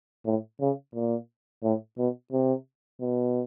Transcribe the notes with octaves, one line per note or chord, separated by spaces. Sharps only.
A2
C#3
A#2
A2
B2
C3
B2